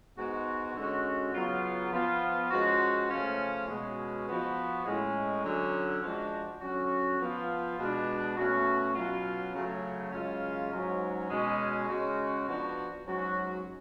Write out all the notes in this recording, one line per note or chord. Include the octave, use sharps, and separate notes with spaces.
G#2 G#3 B3 F#4
D3 G#3 C#4 F#4
C#3 F#3 B3 F4
F3 B3 F4
F3 G#3 C#4 F#4
C#3 F3 A3 C#4 F4
B2 G#3 C#4
F3 B3 F#4
A2 G#3 C#4
D3 F#3 C#4
F3 G#3 D4 F#4
D3 F#3 C#4 F#4
F3 B3 F4
B2 G#3 D4
B2 A3 C#4 F#4
B2 F#3 C#4 F4
C#3 F#3 A3
F#2 C#3 G#3 C#4 F4
G#2 F#3 C#4
B2 G#3 C#4
C#3 G#3 C#4 F#4
F3 B3 D4 F#4
G#2 F#3 C#4 F#4